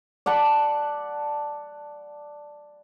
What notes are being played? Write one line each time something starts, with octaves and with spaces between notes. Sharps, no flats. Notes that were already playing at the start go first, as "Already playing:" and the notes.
D5 F#5 A5 B5